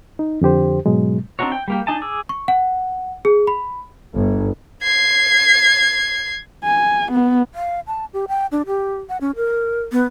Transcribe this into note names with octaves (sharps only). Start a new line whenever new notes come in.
D#4
F2 D3 G4 C5
G#2 B2 F#3 G#3
C4 D4 D#4 F#4 C#5
G5
G3 A#3 G4
D4 D#4 D#5 G#5 A5
G#4 D6 E6
C#6
F#5
G#4
B5
G1
G#6 C7
G#5
B3
F5
A5
G4
G5
D4
G4
F#5
C#4
A#4
B3